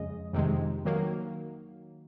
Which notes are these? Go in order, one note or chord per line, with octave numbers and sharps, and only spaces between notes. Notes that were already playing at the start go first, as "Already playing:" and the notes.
Already playing: F2 C#3 G#3 D#5
F2 C3 D#3 G#3
D#3 F#3 A#3